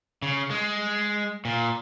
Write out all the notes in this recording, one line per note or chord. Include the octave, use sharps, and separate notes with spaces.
C#3
G#3
A#2